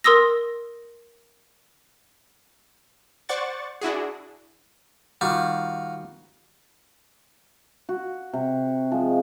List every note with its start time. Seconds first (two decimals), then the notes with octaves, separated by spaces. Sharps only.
0.04 A#4 C6 D#6 E6 A#6
3.29 C5 D5 F#5 C#6 A6
3.81 D4 E4 F#4 G#4
5.21 D#3 G3 F4 F#4
7.89 F#4
8.33 C3
8.92 F3 G#3